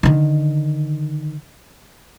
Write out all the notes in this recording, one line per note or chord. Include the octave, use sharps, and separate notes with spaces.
D3 D#3